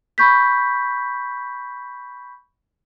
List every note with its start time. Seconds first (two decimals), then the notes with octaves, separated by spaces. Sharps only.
0.18 B5 C#6 G6 B6